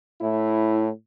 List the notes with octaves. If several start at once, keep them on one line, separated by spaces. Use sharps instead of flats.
A2 E4